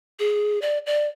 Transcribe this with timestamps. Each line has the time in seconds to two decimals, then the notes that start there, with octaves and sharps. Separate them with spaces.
0.19 G#4
0.62 D5
0.86 D5